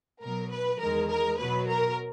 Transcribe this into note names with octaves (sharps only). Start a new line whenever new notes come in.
B2 F#3 A#4
B4
E2 D#3 G#3 A#4
A#4
B2 F#3 B4
A#4